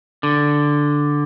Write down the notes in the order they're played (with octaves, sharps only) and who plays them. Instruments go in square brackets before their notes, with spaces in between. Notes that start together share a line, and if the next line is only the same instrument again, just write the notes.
[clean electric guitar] D3